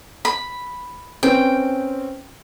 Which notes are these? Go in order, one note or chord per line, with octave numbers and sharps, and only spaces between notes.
B5
C4 C#4 B4 G5